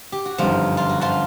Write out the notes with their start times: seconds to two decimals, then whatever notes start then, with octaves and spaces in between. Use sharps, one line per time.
0.12 G4
0.25 F#4
0.38 G1 F#2 D#3 F3 G3 F4
0.77 F4
0.89 F#4
1.01 F3 F4